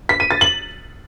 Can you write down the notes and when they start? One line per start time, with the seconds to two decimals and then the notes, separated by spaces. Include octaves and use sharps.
0.09 B6
0.20 D#7
0.31 A6
0.41 F#7